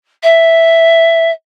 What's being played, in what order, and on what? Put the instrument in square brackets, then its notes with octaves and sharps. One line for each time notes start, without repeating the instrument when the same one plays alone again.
[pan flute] E5